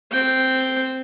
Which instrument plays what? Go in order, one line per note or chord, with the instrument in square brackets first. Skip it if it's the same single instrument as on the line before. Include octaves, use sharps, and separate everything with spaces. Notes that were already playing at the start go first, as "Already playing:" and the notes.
[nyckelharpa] C4 G5